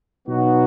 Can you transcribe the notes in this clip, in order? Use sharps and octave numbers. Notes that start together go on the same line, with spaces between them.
B2 F#3 B3 D#4 F#4